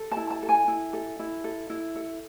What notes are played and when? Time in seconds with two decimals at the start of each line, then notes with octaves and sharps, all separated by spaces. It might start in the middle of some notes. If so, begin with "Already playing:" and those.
Already playing: A4
0.12 A5
0.17 E4
0.30 A5
0.43 A4
0.49 G#5
0.68 E4
0.93 A4
1.19 E4
1.44 A4
1.70 E4
1.96 A4